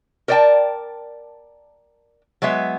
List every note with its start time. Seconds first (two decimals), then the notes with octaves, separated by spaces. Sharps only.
0.28 A#4 C5 D5 D#5 G5 A5
2.42 F#3 G#3 B3 E5